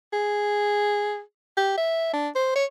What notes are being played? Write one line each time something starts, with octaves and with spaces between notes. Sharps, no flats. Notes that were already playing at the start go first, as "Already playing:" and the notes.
G#4
G4
E5
D4
C5
C#5